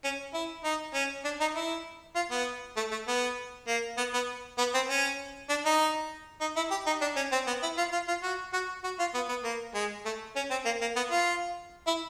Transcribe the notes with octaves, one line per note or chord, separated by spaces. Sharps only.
C#4
E4
D#4
C#4
D4
D#4
E4
F4
B3
A3
A3
B3
A#3
B3
B3
B3
C4
C#4
D4
D#4
D#4
E4
G4
D#4
D4
C#4
C4
B3
E4
F4
F4
F4
F#4
F#4
F#4
F4
B3
B3
A#3
G#3
A3
C#4
C4
A#3
A#3
B3
F4
E4